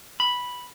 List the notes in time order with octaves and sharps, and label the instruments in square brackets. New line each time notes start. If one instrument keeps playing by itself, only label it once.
[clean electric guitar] B5